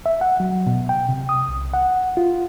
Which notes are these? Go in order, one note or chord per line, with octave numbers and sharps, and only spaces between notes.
E5
F#5
F#3
B2
G5
C3
D#6
C2
F#5
F4